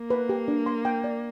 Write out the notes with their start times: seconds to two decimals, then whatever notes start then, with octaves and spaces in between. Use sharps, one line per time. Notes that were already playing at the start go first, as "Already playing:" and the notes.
Already playing: A#3
0.10 B4
0.29 G4
0.48 D4
0.66 C6
0.85 G5
1.04 D5